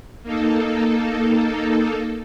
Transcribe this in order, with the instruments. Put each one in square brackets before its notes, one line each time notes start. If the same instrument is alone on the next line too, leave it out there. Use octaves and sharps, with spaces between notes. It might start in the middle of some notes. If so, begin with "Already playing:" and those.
[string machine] A#3 D#4 A4